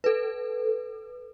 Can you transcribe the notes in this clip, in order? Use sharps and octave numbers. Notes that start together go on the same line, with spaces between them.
A4 B4